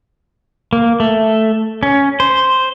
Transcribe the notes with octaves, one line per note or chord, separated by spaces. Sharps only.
A#3
A3
C#4
C5